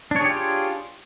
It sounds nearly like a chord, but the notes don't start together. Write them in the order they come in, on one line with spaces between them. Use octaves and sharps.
D4 C#5 G#4 G4 F4